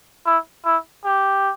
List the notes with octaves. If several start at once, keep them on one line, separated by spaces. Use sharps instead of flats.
E4
E4
G4